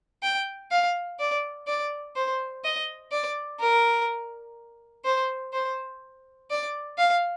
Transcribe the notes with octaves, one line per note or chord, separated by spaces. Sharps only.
G5
F5
D5
D5
C5
D#5
D5
A#4
C5
C5
D5
F5